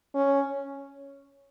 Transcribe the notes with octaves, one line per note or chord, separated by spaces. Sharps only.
C#4